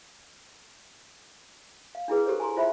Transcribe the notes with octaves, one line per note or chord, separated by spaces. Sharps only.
F5
D4 E4 G#4 B4
G4 A4 C5 C#5
G#5 A#5 C6
E4 F4 C5 E5 B5